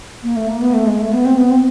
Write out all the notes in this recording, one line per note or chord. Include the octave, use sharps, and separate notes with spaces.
A#3
A3
A#3
B3
A3
G#3
A3
B3
C4
B3
C4